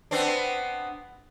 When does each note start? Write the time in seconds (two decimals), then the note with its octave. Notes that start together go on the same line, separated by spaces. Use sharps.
0.11 B3 C4 D4